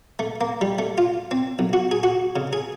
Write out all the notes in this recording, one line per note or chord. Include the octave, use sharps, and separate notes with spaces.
A3
A#3
G3
A3
F4
C4
B1
F#4
G#4
F#4
C#3
G#4